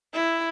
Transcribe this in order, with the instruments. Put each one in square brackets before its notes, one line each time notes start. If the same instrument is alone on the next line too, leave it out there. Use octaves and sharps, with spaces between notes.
[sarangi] E4